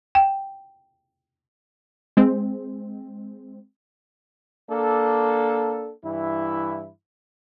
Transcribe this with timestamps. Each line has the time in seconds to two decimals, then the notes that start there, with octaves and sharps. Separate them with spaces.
0.15 G5
2.17 G#3 C4
4.70 A#3 D4 A4
6.05 G2 E3 E4